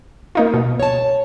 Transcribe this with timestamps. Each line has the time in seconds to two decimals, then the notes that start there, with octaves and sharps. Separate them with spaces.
0.35 A#3 D#4 F4
0.54 B2
0.80 C#5 A5